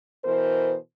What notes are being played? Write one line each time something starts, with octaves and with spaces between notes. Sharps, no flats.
B2 E3 A#4 C5